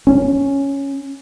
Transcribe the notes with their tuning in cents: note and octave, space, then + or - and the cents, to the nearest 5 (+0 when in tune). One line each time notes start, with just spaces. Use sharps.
C#4 +0